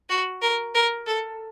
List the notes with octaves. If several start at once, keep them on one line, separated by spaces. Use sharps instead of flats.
F#4
A#4
A#4
A4